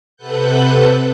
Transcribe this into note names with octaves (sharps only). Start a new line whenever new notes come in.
C3 A4 B4 F#5 F#6 G6